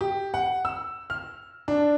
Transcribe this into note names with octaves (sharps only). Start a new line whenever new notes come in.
G4
F#5
E6
F6
D4